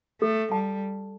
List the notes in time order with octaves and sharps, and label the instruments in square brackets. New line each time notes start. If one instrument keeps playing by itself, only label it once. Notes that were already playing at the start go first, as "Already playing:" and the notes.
[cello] A3 [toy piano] A4
[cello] G3 [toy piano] A5